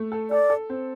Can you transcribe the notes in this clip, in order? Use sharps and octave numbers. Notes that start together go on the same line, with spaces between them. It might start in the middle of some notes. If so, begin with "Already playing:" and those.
Already playing: A3
A4
A4 D5
A4
C4